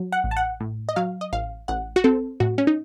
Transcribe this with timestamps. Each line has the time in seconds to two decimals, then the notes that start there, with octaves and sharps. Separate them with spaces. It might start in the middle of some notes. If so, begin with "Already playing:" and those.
Already playing: F#3
0.12 F#5
0.24 A1
0.31 A5
0.37 F#5
0.60 A2
0.89 D#5
0.96 F#3 F5
1.21 D#5
1.33 A1 F5
1.68 A1 F#5
1.96 F#4
2.04 C4 A4
2.40 A2 F#4
2.58 C#4
2.67 D#4